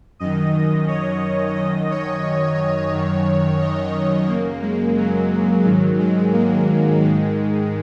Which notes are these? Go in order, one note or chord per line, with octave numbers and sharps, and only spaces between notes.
F#2 D#3 D#5
C#5
F#2 D#3 D#5
C#5
F#2 D#3
D#5
C#5
F#2 C#3 A#3
G#3
F#3
G#2 D#3 F#3
G#3
A#3
G#2 D#3 G#3